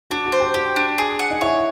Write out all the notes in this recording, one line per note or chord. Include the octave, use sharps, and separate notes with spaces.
D4 F#4
F#4
C5
G4
F#4 G4
D4
G#4
F#5
D#4
E4 C#5